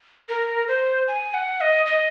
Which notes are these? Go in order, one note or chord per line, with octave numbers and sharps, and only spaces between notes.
A#4
C5
G#5
F#5
D#5
D#5